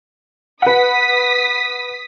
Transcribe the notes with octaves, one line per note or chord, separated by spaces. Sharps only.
B4 F#5 D#6 B6